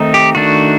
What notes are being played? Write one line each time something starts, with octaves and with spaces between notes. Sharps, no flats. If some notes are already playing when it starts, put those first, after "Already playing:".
Already playing: D#3 A3 C4 D#4
G4
D#3 A3 D4 F#4